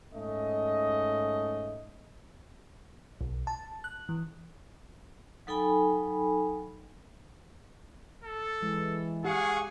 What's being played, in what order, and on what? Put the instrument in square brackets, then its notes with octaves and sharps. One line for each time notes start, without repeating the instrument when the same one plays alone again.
[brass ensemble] G#2 A3 C#4 D#5
[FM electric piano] B1
A5
F#6
E3
[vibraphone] F#3 D#4 A4 G5 G#5 B5
[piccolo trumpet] A4
[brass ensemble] E3 [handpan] G#3
[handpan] G4 [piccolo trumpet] G#4 [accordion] F5 F#5 C#6